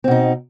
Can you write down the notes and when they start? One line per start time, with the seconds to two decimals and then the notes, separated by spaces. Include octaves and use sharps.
0.04 C4
0.08 B2
0.11 D#4